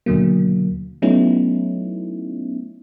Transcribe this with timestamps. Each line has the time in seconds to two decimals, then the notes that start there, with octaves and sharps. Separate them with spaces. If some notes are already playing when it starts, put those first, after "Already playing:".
0.06 D#2 B2 D3 F#3 A#3
1.02 F#3 A3 B3 C#4 D#4 E4